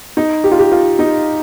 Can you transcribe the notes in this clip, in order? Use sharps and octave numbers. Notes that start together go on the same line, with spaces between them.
D#4
G4
F4
G4
F4
D#4